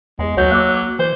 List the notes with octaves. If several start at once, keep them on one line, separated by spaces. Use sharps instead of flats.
E2 G#3
D2 F#3 C#5 F#5 G6
A#3 D6 E6 F#6
D6
E3 C5